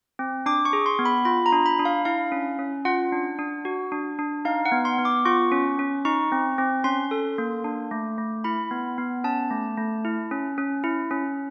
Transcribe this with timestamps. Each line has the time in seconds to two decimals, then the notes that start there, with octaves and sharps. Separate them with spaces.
0.19 C4
0.46 D4 D6
0.65 C#6
0.73 G#4
0.86 C6
0.99 B3
1.05 B5
1.25 F4 B5
1.46 A#5
1.52 D4
1.66 B5
1.79 D4
1.85 F5
2.05 E4 F5
2.32 C#4
2.59 C#4
2.85 F4 F#5
3.12 D4
3.39 D4
3.65 F#4
3.92 D4
4.19 D4
4.45 D#4 F5
4.65 F#5
4.72 B3
4.85 C6
4.98 B3
5.05 D6
5.25 F4 C#6
5.52 C#4
5.79 C#4
6.05 D#4 C#6
6.32 C4
6.58 C4
6.84 C#4 C6
7.11 A4
7.38 A#3
7.64 D4
7.91 A3
8.18 A3
8.44 E4 B5
8.71 B3
8.98 B3
9.24 C#4 A5
9.51 A3
9.78 A3
10.05 E4
10.31 C#4
10.58 C#4
10.84 E4
11.11 C#4